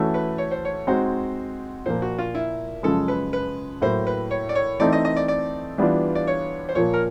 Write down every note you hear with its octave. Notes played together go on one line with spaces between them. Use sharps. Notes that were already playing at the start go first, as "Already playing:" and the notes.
Already playing: E3 A3 C#4 F#4 A4
B4
C#5
C5
C#5
G#3 C4 D#4 F#4 C5
A#2 F3 A#3 C5
F#4
F4
E4
F#2 C#3 F3 G#3 A4
B4
B4
A2 F#3 A#3 C5
B4
C#5
D5
C#5
E3 A3 C4 D#4 D5
D#5
D#5
D5
D5
E3 G3 B3 D4 F4
D5
C#5
C5
A#2 F3 A#3 C#5
A#4